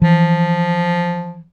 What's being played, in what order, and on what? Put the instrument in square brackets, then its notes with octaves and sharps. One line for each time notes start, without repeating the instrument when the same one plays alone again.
[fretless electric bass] E3 [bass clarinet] F3